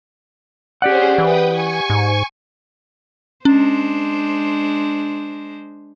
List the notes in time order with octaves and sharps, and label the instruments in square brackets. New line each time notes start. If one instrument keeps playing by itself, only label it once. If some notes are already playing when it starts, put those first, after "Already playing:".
[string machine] C#4 G#4 C5 [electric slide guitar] G4 D5 F#5
[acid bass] E3 [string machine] B4 G5 D#6
[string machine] G#5 C#6
[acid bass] G#2
[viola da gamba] G#3 D4 C5 [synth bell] C#4